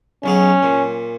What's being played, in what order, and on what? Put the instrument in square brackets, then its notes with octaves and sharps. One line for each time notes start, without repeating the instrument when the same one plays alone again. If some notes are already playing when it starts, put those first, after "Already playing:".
[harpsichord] B1 F#3 G#4 [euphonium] C#4
[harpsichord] A#2